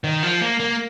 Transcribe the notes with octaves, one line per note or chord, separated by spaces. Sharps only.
D#3
F3
A#3
A#3